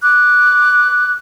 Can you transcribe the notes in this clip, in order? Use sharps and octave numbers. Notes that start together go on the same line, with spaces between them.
D6 F#6